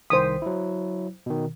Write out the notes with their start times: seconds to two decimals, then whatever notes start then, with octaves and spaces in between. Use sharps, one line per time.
0.10 C2 D#3 C5 D#6 B6
0.42 F#3 E4
1.26 B2 D#3